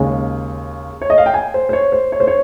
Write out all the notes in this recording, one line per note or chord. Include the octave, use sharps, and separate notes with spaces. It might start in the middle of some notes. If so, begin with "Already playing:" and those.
Already playing: D#2 C#3 G#3
C#5
D#5
F5
G5
G#5
C5
C5
C#5
C5
C#5
C5
C#5